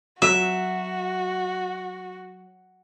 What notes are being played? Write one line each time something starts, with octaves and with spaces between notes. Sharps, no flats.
F#3 F#4 E5